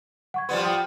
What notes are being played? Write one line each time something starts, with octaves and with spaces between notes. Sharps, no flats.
F#5 C#6 G#6
F3 G3 B3 C6
F4 G5 D#6